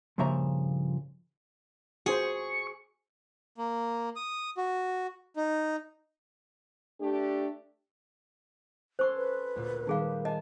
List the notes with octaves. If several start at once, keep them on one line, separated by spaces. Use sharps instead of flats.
G2 A#2 C#3 F3 E5 A#5
F#4 G#4 C5 C#6
A#3
D#6
F#4
D#4
A3 D4 G4
C#4 A4 C5 C6 C#6
B4
D2 A#2
D#3 G3 D#4 G#4 C5 F5
D#5 G#5 A5